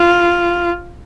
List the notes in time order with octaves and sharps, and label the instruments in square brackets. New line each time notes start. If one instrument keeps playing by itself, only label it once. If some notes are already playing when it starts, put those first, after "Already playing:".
Already playing: [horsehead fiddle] F4